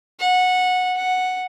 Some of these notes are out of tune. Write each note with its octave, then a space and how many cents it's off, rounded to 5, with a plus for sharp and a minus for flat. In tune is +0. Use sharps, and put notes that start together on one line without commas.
F#5 -15
F#5 -5